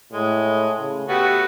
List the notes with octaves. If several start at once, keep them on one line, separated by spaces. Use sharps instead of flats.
A2 G#3
C#3
A3 B3 F#4 G4